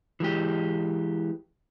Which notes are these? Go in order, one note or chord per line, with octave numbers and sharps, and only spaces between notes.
E3 G#3 G4